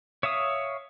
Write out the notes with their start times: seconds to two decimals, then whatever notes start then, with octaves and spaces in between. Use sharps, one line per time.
0.23 C#5 E5 F5 D#6